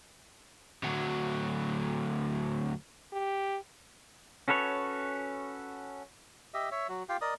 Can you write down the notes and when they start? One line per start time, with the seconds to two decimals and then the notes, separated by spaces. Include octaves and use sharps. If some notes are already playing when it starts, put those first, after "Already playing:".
0.83 D2 F#3
3.13 G4
4.48 C#4 F#4 A4 B4 C#5
6.54 G4 D#5 E5
6.71 C#5 E5
6.89 F#3 F#4
7.09 F4 G4 F5 G5
7.21 A#4 D5 D#5 D#6